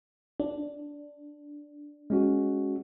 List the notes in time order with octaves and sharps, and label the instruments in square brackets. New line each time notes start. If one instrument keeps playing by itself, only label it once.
[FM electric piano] D4
[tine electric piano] G#3 C#4 F#4